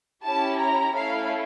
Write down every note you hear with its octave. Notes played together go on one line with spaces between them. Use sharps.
C#4 E4 G4 A5
A#5
A3 C#4 E4 A4 F5